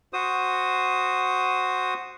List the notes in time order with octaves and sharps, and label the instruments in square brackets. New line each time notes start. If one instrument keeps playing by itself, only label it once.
[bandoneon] F#4 C5 D#6